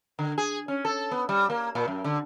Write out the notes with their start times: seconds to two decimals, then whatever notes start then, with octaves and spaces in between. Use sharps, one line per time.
0.19 D3
0.38 G#4
0.68 C#4
0.85 A4
1.11 B3
1.29 G3
1.50 A#3
1.75 A#2
1.88 F#2
2.04 D3